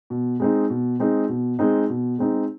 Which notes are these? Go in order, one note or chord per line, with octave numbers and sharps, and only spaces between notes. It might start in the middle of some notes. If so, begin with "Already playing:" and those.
B2
G#3 C4 D#4
B2
G#3 C4 D#4
B2
G#3 C4 D#4
B2
G#3 C4 D#4